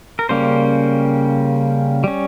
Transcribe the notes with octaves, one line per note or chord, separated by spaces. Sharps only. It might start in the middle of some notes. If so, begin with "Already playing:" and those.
A#4
C#3 G3 A#3 C#4 C5
G3 C#4